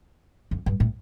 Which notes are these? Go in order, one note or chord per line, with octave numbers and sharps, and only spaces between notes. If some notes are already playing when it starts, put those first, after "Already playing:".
F2
G2
A2